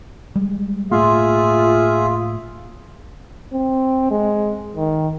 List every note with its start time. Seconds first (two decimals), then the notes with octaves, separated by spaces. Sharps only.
0.35 G3 G#3
0.91 A2 A3 A#3 F4 G#4 E5
3.53 C4
4.11 G#3
4.76 D#3